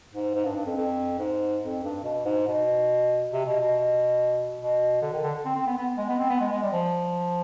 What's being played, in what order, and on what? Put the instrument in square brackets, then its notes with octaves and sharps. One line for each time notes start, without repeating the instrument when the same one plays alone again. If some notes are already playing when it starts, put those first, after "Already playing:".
[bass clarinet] G#2
G#2
G2
G2
F2
F2
G#2
F2
G2
B2
G#2
B2
C3
B2
B2
B2
D3
D#3
D3
C4
C4
B3
B3
G#3
B3
C4
B3
G#3
G#3
G3
F3